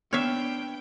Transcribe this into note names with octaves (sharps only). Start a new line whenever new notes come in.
B3 D4 C#5 E5 G5 F6 C7